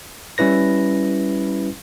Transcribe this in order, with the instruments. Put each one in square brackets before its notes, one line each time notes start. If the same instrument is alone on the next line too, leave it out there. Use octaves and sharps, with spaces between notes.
[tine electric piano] G3 C#4 E4 B4 A#6